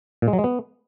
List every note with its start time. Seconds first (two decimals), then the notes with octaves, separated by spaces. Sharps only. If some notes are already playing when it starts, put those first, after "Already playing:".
0.22 A#2
0.28 G#3
0.33 F#3
0.39 G#3
0.44 B3